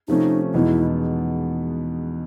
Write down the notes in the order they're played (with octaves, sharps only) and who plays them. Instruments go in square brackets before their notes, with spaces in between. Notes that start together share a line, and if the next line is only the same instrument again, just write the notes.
[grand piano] C3 F3 A3 C#4 [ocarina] D#4
[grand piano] E2 B2 G#3 B3 D#4 [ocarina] E4